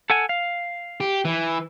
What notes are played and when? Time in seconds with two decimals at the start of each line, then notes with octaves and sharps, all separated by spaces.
0.10 A4 F#5 G#5
0.29 F5
1.00 G4
1.25 E3